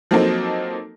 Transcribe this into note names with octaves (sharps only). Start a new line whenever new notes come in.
F3 F#3 A#3 C4 D#4 A4